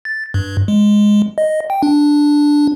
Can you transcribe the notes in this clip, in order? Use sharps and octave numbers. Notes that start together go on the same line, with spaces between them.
A6
G2
G#3
D#5
G5
D4